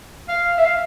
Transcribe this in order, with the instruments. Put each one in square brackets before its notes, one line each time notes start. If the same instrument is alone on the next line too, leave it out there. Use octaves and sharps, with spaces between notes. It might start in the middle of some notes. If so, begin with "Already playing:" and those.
[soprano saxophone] F5
E5
F5